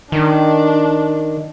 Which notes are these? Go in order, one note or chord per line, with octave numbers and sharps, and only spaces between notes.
D#3 D4